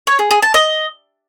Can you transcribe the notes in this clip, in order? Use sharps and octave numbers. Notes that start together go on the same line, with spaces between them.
C#5
G#4
G#4
A5
D#5